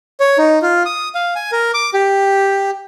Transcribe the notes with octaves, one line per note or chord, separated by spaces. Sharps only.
C#5
D#4
F4
D#6
F5
G#5
A#4
D6
G4